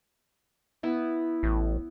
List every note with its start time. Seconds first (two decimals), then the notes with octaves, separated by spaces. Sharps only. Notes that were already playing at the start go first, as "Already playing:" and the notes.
0.83 B3 E4
1.43 A1